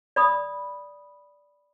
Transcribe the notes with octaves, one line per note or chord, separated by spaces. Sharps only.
D5 B5 D#6